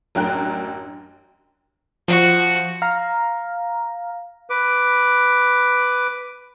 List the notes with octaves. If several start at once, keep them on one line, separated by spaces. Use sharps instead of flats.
A1 F#2 D4 A#4 G5 F#6
F3 F#4
F5 A#5
B4 D6